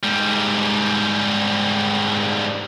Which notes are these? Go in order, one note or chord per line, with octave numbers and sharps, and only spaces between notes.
G#2 G3